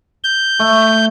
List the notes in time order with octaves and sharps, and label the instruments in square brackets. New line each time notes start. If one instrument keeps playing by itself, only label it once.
[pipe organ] G6
[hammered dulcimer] A3